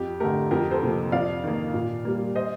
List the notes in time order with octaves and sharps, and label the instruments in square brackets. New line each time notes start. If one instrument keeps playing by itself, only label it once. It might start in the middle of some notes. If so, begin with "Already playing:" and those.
Already playing: [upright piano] F2 G4
D3 A3 G4 A#4
F2 G4 A#4
A4 C5
C3 F3 A#3
F2 D5 F5
D#3 A#3
A#2
G3 A#3
C5 D#5